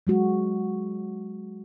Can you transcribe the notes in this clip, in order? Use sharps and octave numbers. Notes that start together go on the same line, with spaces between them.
F#3 G#3 F#4